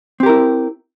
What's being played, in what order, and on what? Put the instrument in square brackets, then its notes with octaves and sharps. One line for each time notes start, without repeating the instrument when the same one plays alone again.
[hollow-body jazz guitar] C4
G4
A#4
E4